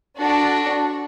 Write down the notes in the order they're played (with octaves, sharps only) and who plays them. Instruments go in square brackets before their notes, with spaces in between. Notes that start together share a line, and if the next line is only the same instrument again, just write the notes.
[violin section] D4 F#4 A4